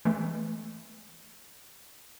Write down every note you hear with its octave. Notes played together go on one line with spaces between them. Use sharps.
E3 G#3 A3